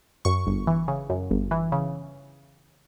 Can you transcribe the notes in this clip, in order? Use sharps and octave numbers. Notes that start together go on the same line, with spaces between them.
F#2 C#6
G1
E3
C#3
F#2
G1
E3
C#3